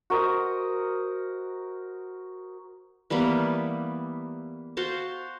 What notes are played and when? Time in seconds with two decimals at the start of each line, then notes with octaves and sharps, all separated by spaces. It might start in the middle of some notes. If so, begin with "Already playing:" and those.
0.10 F#4 A#4 C5 D#5
3.10 E3 G3 A#3 B3
4.77 F#4 C5 F5 A5